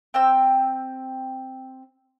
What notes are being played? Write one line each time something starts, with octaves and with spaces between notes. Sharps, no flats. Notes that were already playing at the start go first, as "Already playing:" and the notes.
C4 G5 E6